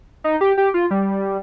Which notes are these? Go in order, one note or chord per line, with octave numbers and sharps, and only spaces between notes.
D#4
G4
G4
F4
G3